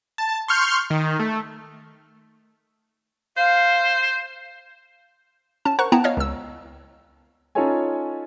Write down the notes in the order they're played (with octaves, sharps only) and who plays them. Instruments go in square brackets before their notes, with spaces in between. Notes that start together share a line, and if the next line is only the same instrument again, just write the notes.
[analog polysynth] A5
C6 C#6 F6 G6
D#3
A3
[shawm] C5 [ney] F5
[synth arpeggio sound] C#4 A5 E7
A#4 C5 F#5 A#5 C#6 F#6
B3 E4 F#5 G5 A5 A#5
C#5 D#5 F5 F6
C#2 E6
[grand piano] C#4 D#4 F4 A4 C#5 G#5